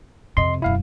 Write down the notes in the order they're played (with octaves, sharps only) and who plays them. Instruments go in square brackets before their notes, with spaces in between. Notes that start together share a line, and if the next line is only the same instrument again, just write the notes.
[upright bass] F2 C3 [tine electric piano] D#5 C6
[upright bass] E1 F#2 [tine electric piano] E4 F5